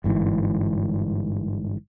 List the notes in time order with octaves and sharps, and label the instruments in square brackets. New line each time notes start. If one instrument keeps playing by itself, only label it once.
[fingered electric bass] G1 G#2 E3